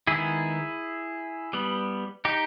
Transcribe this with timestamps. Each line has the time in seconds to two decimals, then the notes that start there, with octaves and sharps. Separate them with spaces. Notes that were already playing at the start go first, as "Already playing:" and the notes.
0.07 D#3 G#3 B3 E4 G#4
1.53 G3 B3
2.25 D#4 G4